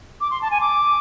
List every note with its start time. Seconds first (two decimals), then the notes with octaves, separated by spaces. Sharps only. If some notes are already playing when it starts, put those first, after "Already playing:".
0.21 D6
0.31 C6
0.41 A5
0.51 G#5
0.61 D6